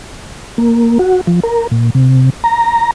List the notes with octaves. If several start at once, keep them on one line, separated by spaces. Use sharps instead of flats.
A#3
F#4
F3
A#4
A#2
C3
A#5